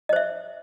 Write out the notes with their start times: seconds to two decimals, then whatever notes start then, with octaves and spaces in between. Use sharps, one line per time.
0.09 D#5
0.13 C5
0.16 E5